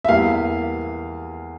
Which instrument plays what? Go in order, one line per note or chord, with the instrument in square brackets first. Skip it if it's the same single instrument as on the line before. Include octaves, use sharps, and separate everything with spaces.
[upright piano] E5
E2 E3 G3 A#3 F5